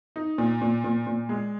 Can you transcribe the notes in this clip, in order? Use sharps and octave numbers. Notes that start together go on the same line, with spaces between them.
D#4
A#2
A#2
A#2
A#2
G#3